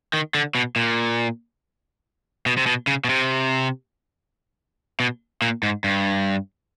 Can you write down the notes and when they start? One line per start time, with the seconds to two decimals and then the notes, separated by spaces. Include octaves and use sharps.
0.14 D#3
0.35 D3
0.55 B2
0.76 A#2
2.46 B2
2.57 C3
2.66 B2
2.87 C#3
3.04 B2
3.09 C3
5.00 B2
5.42 A#2
5.63 G#2
5.84 G2